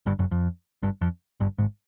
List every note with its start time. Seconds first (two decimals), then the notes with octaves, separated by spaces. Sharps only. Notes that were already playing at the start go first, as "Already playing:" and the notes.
0.06 G1 G2
0.19 F#1 F#2
0.31 F2
0.83 G1 G2
1.01 F2
1.40 G1 G2
1.58 G#1 G#2